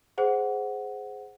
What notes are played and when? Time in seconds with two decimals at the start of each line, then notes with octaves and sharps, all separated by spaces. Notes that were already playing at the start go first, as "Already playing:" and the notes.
0.18 G#4 C5 F#5